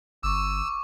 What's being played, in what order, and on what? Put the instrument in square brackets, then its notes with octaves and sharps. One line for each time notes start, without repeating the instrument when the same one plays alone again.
[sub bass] G1 [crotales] C#6 D6 [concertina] E6